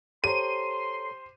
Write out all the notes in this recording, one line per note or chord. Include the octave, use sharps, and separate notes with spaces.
G4 A4 C5 C#5 A#5 C6 D#7